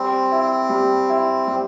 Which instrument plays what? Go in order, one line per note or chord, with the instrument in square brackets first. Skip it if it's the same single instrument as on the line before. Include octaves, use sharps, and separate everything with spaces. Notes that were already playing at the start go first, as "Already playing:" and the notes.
Already playing: [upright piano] G3 [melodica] C4
[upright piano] E4
G3
E4
G3